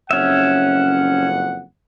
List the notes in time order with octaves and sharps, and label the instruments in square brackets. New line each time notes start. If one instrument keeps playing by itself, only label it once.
[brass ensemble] F#1 F2 F#5 [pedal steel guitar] C#4 E5